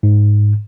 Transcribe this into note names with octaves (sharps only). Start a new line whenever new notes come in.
G#2